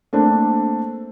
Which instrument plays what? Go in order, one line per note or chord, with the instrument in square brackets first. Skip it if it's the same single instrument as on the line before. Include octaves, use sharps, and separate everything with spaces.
[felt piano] A3 A#3 C4 D4